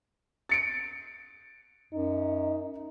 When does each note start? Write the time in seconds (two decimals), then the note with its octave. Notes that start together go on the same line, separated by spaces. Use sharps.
0.49 A6 C#7 D7
1.93 F#2 D#4